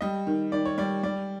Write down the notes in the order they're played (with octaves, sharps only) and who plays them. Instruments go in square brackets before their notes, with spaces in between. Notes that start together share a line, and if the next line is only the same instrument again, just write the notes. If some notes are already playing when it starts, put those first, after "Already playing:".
[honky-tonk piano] G3 [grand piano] D#5
[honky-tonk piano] D#3
[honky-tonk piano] D#3 [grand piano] D5
[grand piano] C#5
[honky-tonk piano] G3 [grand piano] D5
[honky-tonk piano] G3 [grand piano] D5